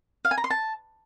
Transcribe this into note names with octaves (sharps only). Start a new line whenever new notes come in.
F5
G#5
A#5
C6
A5